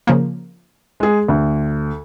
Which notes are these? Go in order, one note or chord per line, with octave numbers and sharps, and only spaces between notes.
C#3 F3 A#3
G#3 G#4
D2